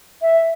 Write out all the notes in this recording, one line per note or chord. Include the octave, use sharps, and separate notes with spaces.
E5